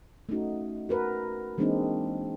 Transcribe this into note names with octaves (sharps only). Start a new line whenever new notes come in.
A3 C#4 D#4 F#4
F#4 A#4 B4
E3 G#3 A#3 C4 D4 D#4